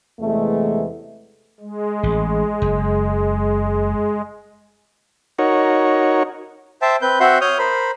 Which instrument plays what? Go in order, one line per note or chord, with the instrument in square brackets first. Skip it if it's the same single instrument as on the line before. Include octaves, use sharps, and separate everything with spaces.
[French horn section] E2 C3 E3 G#3 A3
[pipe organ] G#3
[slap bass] A1
F#1
[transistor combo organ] D#4 F#4 A#4 C#5
[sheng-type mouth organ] C5 E5 G5 A5
C4 B4 G6
C4 F#4 E5 F#5 C6 G6
C#5 D#6 F6 G6
A#4 C5 B5